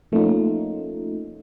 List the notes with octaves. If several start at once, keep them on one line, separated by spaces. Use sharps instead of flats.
F3 A3 A#3 C#4 D#4 F4